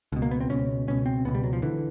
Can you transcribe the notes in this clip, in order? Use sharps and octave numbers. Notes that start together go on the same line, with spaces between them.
C#2 B2
A#3
B3
C4
C#2 B2 C#4
C#2 B2 C#4
C4
C#2 B2 B3
G3
F#3
F3
D3 E3